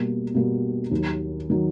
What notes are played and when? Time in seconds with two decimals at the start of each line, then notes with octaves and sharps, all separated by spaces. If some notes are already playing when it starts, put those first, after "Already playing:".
Already playing: B2 G3 A#3
0.34 B2 G3 A#3
0.91 D#2 D#3 F#3
1.50 D#3 F#3